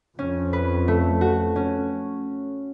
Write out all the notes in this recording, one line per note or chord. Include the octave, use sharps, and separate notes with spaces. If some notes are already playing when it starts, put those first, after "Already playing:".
F2 C#4
B4
A3
F#4
C#4